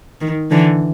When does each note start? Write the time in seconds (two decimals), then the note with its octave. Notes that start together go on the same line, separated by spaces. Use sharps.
0.21 D#3
0.51 D3 E3